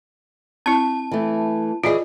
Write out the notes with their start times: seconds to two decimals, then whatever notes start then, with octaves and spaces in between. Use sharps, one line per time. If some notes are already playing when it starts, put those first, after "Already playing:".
0.66 C4 E4 A5
1.12 E3 A3
1.84 E3 F4 G#4 D5 D#5